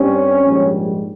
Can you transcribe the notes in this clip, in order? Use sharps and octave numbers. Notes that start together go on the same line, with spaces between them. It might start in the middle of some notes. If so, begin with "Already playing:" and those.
Already playing: G2 G3 C4 C#4
A#1 G#2 G3